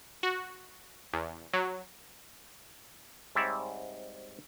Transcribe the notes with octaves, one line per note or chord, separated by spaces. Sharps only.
F#4
E2
F#3
G#2 G3 C4 C#5 D5 E5